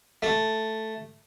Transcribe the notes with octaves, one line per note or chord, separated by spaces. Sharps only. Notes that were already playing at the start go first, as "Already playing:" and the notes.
A3